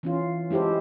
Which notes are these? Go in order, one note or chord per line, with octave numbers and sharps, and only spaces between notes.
E3 C#4 F4
G#3 E4 G4 A4 C5